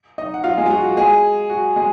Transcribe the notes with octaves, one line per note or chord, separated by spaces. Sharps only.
D#4 D#5
F#5
F4 F5
G#3 G#4
F4
F#4
F#4
G#3 G#4
F#4
G#3 G#4